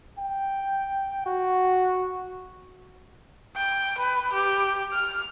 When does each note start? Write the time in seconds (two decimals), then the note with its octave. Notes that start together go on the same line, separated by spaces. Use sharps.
0.19 G5
1.26 F#4
3.56 G5
3.98 B4
4.33 G4
4.93 F6